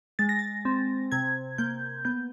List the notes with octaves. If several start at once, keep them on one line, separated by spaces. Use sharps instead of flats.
G#3 A6
A#6
A6
C4
C3 G#6
A#3 G6
B3 G6